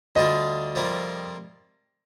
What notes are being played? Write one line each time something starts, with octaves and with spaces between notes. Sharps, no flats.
D2 D3 G3 D4 F4 D#5
F2 C3 G3 A#3 F4